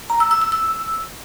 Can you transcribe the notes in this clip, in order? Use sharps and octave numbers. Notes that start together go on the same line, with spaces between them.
A#5
E6
E6
E6
E6